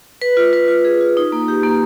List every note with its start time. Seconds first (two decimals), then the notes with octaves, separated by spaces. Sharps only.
0.22 B4
0.37 F4
0.53 B4
0.68 F4
0.85 G#4
1.01 F4
1.17 D#4
1.32 A#3
1.48 G4
1.63 A#3